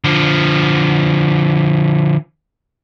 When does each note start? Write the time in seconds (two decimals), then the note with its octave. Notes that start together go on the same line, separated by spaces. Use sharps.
0.04 D3 F3